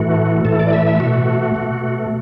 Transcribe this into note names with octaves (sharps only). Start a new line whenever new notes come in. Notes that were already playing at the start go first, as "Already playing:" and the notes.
Already playing: A2 E3 A3 F#4
A2 E3 A3 A4
D5
E5
E5
B2 A3 F#4
B2 A3